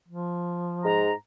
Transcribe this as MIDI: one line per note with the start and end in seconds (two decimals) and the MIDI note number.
0.08 1.05 53
0.84 1.11 44
0.84 1.11 82